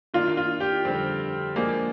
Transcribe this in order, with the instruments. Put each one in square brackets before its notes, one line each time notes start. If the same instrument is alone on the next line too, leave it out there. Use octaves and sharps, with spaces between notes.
[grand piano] D#3 A#3 D4 [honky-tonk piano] F4
[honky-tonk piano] F4
G4
[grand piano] F2 D3 G3 [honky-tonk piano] C4
[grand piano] F3 G#3 D4 G#4 [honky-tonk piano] A#3